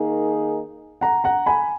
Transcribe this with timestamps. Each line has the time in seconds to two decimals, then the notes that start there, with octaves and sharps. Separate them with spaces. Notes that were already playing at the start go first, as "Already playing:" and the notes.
Already playing: D#3 A#3 D#4 G#4
1.01 F#5 A#5
1.24 F#5 A#5
1.46 G#5 B5